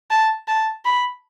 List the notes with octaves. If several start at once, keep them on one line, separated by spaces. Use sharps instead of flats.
A5
A5
B5